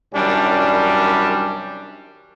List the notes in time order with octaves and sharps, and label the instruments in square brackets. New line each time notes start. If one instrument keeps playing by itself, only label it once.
[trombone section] C2 F#2 D#3 G3 C#4 D4